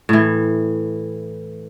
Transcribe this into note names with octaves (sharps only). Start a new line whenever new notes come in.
A2 E3